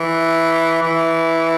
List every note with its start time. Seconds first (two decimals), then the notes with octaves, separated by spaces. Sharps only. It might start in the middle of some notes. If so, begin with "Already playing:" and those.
Already playing: E3
0.82 E3